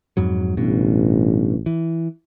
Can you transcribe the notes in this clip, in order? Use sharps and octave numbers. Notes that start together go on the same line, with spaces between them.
F2 G#2 F#3
A1 G2 B2
E3